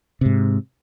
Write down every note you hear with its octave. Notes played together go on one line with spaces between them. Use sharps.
G#2 C3